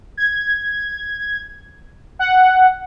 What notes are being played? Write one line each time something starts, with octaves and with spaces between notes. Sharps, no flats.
G#6
F#5